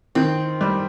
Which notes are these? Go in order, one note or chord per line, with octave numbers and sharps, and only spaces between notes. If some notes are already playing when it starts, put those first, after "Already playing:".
D#3 C4
G3